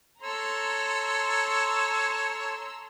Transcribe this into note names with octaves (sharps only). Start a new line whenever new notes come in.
A4 C#5 A#5 C6 E6